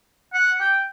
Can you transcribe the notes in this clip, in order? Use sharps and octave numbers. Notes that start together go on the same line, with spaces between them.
F#5
G5